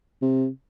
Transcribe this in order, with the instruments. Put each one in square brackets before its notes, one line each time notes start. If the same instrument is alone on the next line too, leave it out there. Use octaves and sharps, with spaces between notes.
[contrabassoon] C3